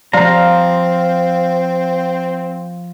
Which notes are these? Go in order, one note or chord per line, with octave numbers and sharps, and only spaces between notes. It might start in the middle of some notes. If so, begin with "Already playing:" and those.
F3 C4 D5 F5 A#5